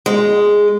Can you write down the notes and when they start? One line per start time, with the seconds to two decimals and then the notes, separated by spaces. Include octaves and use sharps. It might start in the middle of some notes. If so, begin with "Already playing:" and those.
0.06 G#3